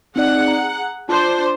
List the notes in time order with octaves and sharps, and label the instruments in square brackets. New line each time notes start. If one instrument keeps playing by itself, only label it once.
[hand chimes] C4 D#4 D5 [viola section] G#4 F#5
[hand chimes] A#5
[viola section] D4 C5 [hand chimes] F4 A5